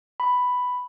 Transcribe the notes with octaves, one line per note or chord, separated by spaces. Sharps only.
B5